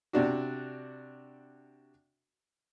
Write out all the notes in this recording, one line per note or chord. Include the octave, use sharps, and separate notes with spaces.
C3 D4 F#4